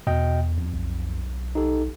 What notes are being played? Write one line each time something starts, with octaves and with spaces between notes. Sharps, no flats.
E2 B2 D#5 G5
F2
B1
D#4 G4 A4